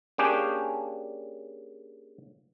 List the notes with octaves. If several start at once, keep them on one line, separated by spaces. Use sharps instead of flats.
A#3 C#4 D4 G4 G#4